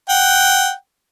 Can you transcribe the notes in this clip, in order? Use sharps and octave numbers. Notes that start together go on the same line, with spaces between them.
F#5 G5